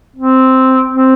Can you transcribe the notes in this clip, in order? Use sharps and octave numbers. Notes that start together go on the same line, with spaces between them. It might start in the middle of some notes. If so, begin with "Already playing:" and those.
C4
C4